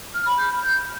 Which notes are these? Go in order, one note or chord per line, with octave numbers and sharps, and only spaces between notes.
F6
B5
G6